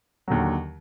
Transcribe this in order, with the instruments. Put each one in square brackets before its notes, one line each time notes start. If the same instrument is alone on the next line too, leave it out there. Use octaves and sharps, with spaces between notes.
[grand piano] D#2 D3 F#3